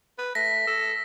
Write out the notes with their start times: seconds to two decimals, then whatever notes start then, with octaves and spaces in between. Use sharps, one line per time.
0.18 B4
0.35 A3 A#6 B6
0.67 A4